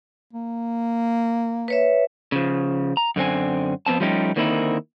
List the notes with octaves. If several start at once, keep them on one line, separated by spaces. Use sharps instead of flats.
A#3
B4 C#5 E5
C#3 F3
A#5
F#2 D3 C4 G#5
F2 B3 C4 A5
F3 G3 A3 C#4 D#4 G4
D3 D#3 A#3 C4 D#4 E4